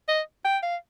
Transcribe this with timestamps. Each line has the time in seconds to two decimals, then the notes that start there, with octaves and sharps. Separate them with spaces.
0.08 D#5
0.45 G5
0.63 F5